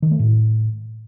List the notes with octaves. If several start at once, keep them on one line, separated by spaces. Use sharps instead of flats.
D#3
A3
A2